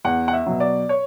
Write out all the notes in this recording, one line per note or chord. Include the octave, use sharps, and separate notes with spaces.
E2 F#5
F#5
E5
B2 F#3
D5
C#5